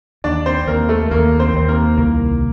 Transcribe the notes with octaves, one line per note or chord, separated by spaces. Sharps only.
D#2 D4 D5
C4 C5
D#2 A#3 A#4
A3 A4
D#2 A#3 A#4
C4 C5
D#2 C5
A#3 A#4
C2 A#3 A#4